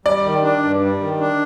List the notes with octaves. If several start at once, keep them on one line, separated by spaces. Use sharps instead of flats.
G3 D5
D#3
D4
G2
G3
D#3
D4